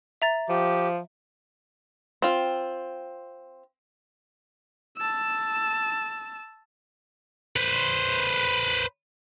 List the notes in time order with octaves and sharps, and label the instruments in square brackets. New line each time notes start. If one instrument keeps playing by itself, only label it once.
[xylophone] E5 A#5 A6
[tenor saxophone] F3 [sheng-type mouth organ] G4
[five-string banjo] C4 F4
[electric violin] A5 E6
[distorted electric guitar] B4 C5